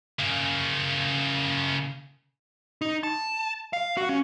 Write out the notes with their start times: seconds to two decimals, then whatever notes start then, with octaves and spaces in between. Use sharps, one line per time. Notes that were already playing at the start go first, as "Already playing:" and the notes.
0.19 C#3 A#3
2.81 D#4
3.03 A5
3.73 F5
3.97 F#4
4.09 C#4